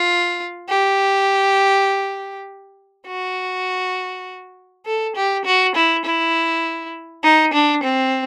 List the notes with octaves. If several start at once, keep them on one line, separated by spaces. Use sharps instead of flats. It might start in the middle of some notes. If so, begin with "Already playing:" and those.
Already playing: F4
G4
F#4
A4
G4
F#4
E4
E4
D#4
D4
C4